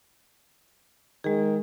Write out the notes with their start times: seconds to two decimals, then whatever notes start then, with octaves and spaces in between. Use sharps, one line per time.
1.24 D#3 G#3 G#4